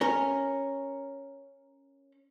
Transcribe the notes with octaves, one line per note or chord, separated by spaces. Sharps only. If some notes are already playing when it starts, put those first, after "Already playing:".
C#4 A#4